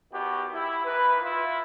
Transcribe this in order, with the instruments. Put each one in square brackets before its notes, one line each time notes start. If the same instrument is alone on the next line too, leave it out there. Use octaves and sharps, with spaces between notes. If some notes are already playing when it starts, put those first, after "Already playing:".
[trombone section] E2 D#3 B3 F#4 G4
E4
D#3 E3 B4
E4 F4